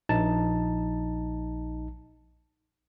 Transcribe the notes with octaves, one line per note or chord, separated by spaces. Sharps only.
A#1 D#4 A5